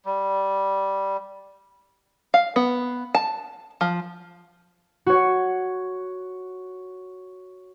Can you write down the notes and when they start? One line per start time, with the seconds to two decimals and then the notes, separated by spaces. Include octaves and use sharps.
0.05 G3
2.34 F5
2.56 B3
3.15 A5
3.81 F3
5.06 F#4 C#5